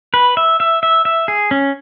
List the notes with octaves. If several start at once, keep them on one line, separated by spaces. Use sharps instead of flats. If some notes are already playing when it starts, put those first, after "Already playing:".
B4
E5
E5
E5
E5
G#4
C#4